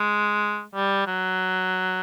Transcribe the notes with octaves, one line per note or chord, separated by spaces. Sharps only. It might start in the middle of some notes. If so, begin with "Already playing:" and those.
Already playing: G#3
G3
F#3